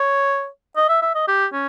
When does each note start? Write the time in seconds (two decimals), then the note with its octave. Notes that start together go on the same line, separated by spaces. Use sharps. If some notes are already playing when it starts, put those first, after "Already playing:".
Already playing: C#5
0.77 D#5
0.89 E5
1.02 E5
1.15 D#5
1.28 G4
1.53 C#4